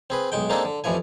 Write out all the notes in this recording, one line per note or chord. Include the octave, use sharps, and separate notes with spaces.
C4 G#4 B4
B1 G#3 G5
A#3 C4 D4 D#4 G#4 A4
D3
A1 F2 E3 F3 G#5